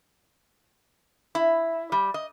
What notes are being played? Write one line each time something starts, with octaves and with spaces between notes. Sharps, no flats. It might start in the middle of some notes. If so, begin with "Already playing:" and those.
E4
G3
D#5